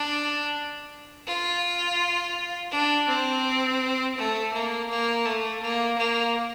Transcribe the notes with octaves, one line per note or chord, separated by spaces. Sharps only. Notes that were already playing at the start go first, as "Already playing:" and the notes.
Already playing: D4
F4
D4
C4
A3
A#3
A#3
A3
A#3
A#3